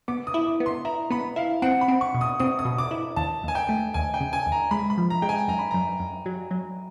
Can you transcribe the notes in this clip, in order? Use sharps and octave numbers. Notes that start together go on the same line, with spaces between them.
B3 D6
D#6
E4
D6
B3
C6
E4 A#5
B3 B5
E4 F5
C4 F#5
B5
C4
C#6
B2
D#6
C4 D#6
D#6
B2
D6
E4
D#2 A5
D#2 G#5
G5
A3
D#2 G#5
G5
C#3
G#5
D#2
A#5
G#3 B5
B5
F3
A#5
G#3 G5
G#5
F#2 A#5
B5
F#2 A#5
F#2
F#3
F#3